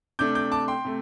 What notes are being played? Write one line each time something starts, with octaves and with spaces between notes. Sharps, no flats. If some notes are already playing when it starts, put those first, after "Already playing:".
C3 A3 D4 D6 G6
D6 G6
A5 D6
G5 C6
C3 A3